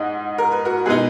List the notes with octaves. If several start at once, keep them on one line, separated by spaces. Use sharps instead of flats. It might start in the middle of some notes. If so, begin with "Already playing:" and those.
Already playing: G#2 D#5 F#5
A#4
B4
F#4 A#4
B2 G#3 B3 D#4 G#4 B4